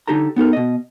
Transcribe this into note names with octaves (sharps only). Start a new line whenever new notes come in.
D3 D#4 G4 A4 A#5
B3 D#4 A4 A#4
B2 D#5